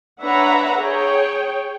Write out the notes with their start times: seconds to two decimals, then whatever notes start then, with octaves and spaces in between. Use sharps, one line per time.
0.22 D4 B4 C#5 E5 F#5 A#5
0.80 G#4 C#5 G5